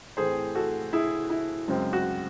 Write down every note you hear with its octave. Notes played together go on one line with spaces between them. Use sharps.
A2 E3 A3 C4 G#4 C5
F#4 A4
E4 G#4
E4
F#2 C#3 G#3 C4
F#4